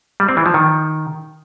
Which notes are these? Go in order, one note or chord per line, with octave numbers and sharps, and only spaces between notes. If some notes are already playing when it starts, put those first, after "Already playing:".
G3
C4
E3
F3
D#3